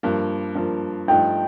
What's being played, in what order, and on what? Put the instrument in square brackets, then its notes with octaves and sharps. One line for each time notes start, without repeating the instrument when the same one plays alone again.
[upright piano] G2 F3 A#3
G2 F3 A#3
[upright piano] G2 F3 A3 D#4 [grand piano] G5